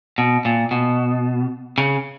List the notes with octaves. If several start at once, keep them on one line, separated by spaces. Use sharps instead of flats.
B2
A#2
B2
C#3